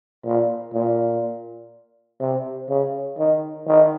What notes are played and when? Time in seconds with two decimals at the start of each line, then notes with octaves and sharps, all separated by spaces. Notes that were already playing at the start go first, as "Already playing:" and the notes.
0.25 A#2
0.74 A#2
2.20 C3
2.69 C#3
3.18 D#3
3.67 D#3